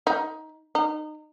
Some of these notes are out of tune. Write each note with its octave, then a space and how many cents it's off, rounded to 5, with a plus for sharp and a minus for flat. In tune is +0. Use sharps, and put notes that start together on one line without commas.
D#4 +15
D#4 -25